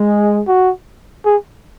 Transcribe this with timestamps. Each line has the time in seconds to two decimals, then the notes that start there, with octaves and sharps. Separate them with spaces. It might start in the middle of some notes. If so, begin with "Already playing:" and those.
Already playing: G#3
0.48 F#4
1.25 G#4